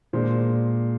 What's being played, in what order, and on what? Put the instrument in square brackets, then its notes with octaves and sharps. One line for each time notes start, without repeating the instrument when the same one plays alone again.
[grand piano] A#2 G#3 D4 C5